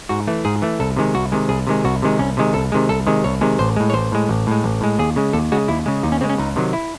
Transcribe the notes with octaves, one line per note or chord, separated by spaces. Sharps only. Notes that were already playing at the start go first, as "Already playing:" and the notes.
G#2 F#4
E3 A3
G#2 G#4
E3 A3
C2 A4
C3 D#3 G#3
C2 F#4
C3 D#3 G#3
C2 G#4
C3 D#3 G#3
C2 F#4
C3 D#3 G#3
C2 C#4
C3 D#3 G#3
C2 A4
C3 D#3 G#3
C2 A4
C3 D#3 G#3
C2 C#5
C3 D#3 G#3
A1 C5
A2 G#3
C#5
A1 C5
A2 G#3
A1
A2 G#3
A1
A2 G#3
D#2 G#4
C#3 G#3
D#2 A4
C#3 G#3 F#4
D#2 E4
C#3 G#3
D#2 D#4
C#4
C#3 G#3 C4
C#4
C#2 D#4
C3 D#3 F#3
E4